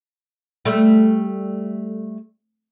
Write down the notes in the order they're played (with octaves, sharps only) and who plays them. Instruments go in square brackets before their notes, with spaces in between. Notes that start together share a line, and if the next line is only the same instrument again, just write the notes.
[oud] G3 A3